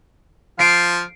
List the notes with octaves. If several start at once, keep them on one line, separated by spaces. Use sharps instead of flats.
F3 F5 C7 D7